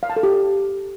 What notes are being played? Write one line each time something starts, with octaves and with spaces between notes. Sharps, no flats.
F5
A5
A4
G4